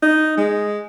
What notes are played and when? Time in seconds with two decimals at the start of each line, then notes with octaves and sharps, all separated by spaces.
0.02 D#4
0.37 G#3